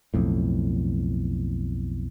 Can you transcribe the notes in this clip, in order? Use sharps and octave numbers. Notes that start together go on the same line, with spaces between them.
B1 F2 A2